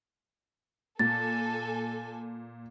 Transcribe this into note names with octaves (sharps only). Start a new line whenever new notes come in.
A#2 A4 G#5 A6